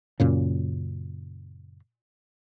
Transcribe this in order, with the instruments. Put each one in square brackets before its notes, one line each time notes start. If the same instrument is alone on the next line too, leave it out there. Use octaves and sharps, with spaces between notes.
[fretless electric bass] F#2 A#2 C#3